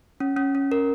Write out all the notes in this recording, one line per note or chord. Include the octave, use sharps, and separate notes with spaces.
C#4
C#4
C#4
A#4